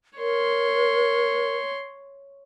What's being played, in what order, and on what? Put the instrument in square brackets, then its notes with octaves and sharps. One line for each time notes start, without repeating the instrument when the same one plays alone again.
[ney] A#4 [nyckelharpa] C#5 C6